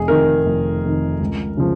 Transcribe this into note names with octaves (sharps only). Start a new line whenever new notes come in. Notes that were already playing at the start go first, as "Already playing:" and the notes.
Already playing: F1 G#4
F2 D#3 A#4
F1
F2 D#3
C#2
C#3 F3